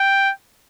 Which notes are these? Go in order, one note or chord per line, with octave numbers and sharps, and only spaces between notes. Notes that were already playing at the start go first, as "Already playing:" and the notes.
Already playing: G5